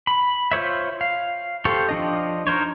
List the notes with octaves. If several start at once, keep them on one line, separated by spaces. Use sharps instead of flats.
B5
F4 C5 C#5 E5
F5
G4 A4 C5 F5 C#6
F3 D4 D#5
D#4 A#4 C5 C#5